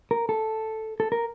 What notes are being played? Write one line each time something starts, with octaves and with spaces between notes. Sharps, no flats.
A#4
A4
A4
A#4